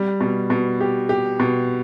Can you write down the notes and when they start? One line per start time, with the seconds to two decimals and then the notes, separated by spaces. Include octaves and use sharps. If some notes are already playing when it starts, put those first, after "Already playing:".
Already playing: G3
0.20 B2
0.50 B2
0.81 G4
1.09 G4
1.39 B2